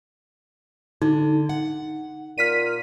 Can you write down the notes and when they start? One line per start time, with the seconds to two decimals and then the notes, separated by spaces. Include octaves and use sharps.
1.02 D3 D#4
1.49 F#5
2.38 A#2 F6 B6 D#7